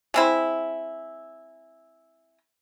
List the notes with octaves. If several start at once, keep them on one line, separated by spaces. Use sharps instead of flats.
G#3 C4 E4